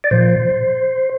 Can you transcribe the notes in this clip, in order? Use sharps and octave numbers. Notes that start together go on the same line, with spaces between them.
D5
A#2 F3 C5